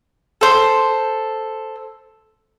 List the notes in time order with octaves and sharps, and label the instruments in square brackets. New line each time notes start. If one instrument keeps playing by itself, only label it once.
[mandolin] A4 C5